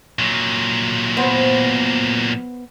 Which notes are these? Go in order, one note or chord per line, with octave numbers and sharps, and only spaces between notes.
A#2 F#3
B3 C5